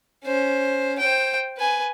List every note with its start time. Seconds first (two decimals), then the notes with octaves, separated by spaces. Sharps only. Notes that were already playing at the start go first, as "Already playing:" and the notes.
0.24 C#4 C5
0.99 C5 G5
1.58 B4 G#5